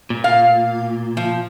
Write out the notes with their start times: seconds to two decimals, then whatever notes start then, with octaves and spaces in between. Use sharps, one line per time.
0.10 A#2
0.24 F5
1.17 F3